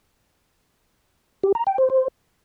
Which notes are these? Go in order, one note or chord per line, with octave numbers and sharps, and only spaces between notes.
G4
A#5
G5
C5
C5